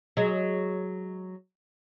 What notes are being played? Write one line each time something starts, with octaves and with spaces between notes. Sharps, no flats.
F#3 G#3